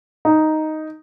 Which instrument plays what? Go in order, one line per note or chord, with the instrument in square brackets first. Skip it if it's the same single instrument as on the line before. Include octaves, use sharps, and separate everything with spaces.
[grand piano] D#4